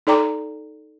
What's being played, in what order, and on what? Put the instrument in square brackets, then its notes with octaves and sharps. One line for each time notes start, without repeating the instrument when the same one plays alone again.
[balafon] D#4 A4 D5 G5 A#5 D6